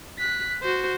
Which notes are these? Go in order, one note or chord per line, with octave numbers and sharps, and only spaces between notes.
F#6 B6
F#4 C5